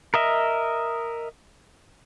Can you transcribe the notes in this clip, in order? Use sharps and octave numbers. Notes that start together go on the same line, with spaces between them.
A#4 D#5 E5